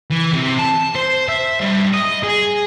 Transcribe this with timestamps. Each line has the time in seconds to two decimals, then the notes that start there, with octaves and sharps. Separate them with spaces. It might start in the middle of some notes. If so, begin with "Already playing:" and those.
0.12 E3
0.33 C3
0.59 A5
0.95 C5
1.29 E5
1.60 G2
1.94 D#5
2.24 G#4